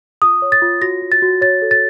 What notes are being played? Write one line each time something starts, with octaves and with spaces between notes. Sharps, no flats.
F4 D#6
C#5
A6
F4
F#4 A#6
F#4
A6
F#4
C#5 A6
A4
A6